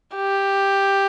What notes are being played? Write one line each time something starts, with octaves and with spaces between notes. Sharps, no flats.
G4